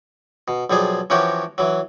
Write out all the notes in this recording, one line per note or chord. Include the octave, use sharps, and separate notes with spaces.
B2
B1 F3 G3 G#4
E3 F3 C#4 F#4 G4 A#4
E3 F#3